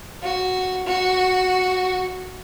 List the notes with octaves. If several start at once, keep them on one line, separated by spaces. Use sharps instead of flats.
F#4
F#4